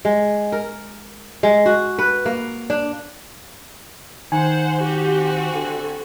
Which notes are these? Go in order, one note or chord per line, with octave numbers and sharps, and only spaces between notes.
G#3
A#4
G#3
F#4
B4
A#3
D4
D#3 C5 F#5 G#5
C4 F#4 G4
D3